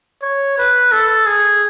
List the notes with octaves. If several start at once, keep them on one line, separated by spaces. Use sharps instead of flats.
C#5
B4
A4
G#4